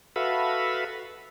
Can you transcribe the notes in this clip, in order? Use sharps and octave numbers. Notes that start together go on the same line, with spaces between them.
F#4 A4 B4 E5 F5 B5